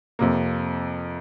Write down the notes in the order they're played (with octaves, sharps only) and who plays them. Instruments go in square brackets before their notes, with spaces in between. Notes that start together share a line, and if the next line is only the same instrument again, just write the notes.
[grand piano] F2 C3 F3 A#3